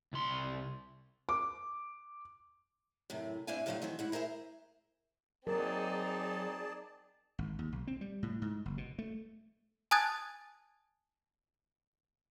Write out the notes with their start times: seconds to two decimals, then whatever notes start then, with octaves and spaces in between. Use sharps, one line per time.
0.13 C2 C6
1.29 D6
3.10 F#2 A2 C3
3.47 G2 C4 D4 E4 F5 G#5
3.66 A2 D3 F3 F#3 G4 F5
3.82 D#3 E3 F#3 C4
3.99 G#2 E4 F#5
4.12 G#4 A#4 C5 D#5 E5
5.47 F#3 C4 D#4 G#4 A#4 D5 A5
7.39 G#1
7.59 D#2
7.72 B1
7.87 C4
8.01 G3
8.23 A2
8.42 G#2
8.66 F#1
8.78 B2
8.99 A3
9.91 G#5 A5 D#6 F#6 G#6 A6